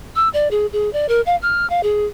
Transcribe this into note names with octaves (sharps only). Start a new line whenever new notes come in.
E6
D5
G#4
G#4
D5
A#4
F5
F6
F5
G#4